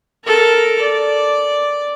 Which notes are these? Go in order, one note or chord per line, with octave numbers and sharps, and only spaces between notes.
A4 A#4
D5